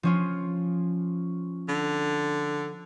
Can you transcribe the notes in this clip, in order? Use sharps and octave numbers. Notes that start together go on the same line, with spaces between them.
F3 C#4 F4
D3